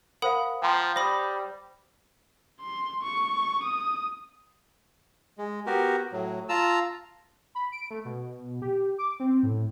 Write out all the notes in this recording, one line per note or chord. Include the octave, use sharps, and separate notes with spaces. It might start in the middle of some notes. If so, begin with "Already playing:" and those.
A#4 C5 F5 F#5 B5 D#6
F3 G5 A#5 C6
G3 C5 B5 D#6 A#6
C6
C#6
D#6
G#3
B3 F#4 G4 A#4
A2 F#3
F4 A5 A#5 E6
B5
D7
A3
B2
G4
D6
C4
A2